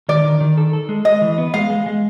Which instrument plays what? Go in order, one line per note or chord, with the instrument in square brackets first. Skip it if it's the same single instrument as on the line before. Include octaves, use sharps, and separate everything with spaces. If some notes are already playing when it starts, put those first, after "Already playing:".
[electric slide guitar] D#3 [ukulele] D5
[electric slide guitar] D#3
D#3
A4
A4
G#3
[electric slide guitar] G#3 [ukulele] D#5
[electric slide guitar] E3
B3
[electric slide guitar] G#3 [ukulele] F5
[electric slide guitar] G#3
G#3